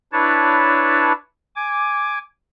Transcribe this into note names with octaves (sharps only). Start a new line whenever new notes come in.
D4 E4 B4 C#5 A5
G#5 D6